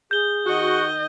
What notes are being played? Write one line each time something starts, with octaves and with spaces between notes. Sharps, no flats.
G#4 G6 G7
D#3 F#4 D#5